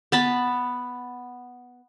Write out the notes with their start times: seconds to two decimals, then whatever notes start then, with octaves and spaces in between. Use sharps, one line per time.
0.12 B3 A5 B5